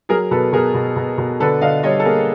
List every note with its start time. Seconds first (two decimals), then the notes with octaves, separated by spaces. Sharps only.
0.09 F#3 G#4 A#4
0.31 B2 A4 B4
0.53 B2 G#4 A#4
0.74 B2
0.96 B2
1.18 B2
1.40 D3 A4 B4
1.61 D3 D#5 F5
1.83 G3 C#5 D#5
2.00 A4
2.05 A#3 G#4 A#4